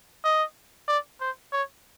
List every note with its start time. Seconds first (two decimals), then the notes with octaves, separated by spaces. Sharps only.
0.24 D#5
0.88 D5
1.21 C5
1.53 C#5